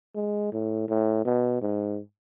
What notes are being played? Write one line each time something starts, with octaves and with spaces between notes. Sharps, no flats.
G#3
A2
A2
B2
G#2